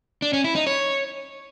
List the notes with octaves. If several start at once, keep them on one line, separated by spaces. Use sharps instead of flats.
D4
C#4
E4
D#4
C#5